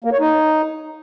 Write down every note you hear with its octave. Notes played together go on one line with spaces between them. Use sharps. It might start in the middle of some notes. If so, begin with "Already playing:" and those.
A#3
C#5
D#4